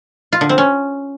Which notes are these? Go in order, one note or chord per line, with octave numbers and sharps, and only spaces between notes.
F4
D3
C4
C#4